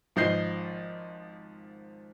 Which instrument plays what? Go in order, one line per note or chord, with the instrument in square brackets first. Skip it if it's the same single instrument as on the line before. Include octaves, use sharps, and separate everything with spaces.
[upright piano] G#1 F3 D#5 G6 C7 G7